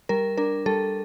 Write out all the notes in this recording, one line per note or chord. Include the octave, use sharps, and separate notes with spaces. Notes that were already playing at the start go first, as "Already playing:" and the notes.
G3 A#4
D4 A#4
G3 A4